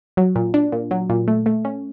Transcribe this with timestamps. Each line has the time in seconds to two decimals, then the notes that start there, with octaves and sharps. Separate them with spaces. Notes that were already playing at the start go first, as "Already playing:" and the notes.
0.17 F#3
0.36 A#2
0.54 D4
0.72 A#2
0.91 F#3
1.10 A#2
1.28 A3
1.46 A3
1.65 C#4